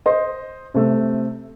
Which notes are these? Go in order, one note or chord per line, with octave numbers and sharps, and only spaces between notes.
C5 D#5
C3 A3